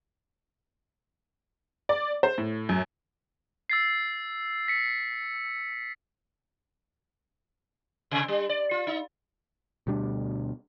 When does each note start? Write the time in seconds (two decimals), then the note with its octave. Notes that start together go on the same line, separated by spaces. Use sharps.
1.89 D5
2.23 C5
2.38 A2
2.69 F#2
3.70 E6 A6 C7
4.68 B6 C#7
8.11 C3
8.28 G3
8.49 D5
8.71 F4
8.87 D#4
9.87 D2 B2 G3 D4